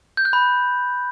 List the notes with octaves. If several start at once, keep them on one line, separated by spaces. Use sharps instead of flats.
G6
F#6
B5